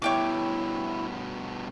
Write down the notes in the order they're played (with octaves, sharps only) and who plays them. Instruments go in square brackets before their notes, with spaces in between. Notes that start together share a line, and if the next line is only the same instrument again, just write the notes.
[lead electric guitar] G2 B2 [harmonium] E4 [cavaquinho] C#5 G5 D6